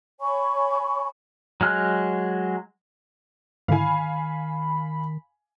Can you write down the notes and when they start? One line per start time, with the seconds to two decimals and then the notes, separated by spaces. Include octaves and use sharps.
0.21 C#5 G#5 B5 C#6
1.61 F#3 G#3 F6 F#6
3.68 G#2 D3 D#3 E4 F5 G#5 B5